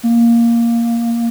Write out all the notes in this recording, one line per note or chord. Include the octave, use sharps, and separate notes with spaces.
A#3